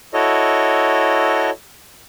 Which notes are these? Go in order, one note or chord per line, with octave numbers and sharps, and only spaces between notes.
E4 F#4 A4 C#5 D#5